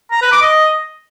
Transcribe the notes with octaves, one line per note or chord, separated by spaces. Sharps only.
A#5
B4
D6
D#5